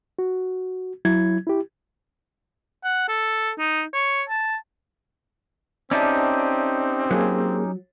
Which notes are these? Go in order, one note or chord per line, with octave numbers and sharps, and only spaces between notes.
F#4
F#3 E4 G#6
E4 G4
F#5
A4
D#4
C#5
A5
C4 C#4 D#4 G4 D5 E5 A5
F#3 A#3 G#4